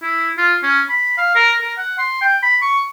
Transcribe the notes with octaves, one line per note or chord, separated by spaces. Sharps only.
E4
F4
C#4
B5
F5
A#4
A#4
F#5
C6
G5
B5
C#6